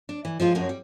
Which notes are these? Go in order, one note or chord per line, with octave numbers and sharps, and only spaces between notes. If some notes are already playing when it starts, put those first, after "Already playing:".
D4
E3
F3 G#3 F4
F#2 F3 G#3 C#4 A#4
G3